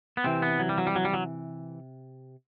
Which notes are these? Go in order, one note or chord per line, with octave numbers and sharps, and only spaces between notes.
B3
C3 E3 C4
B3
F#3
G3
F#3
G3
F#3
G3
F#3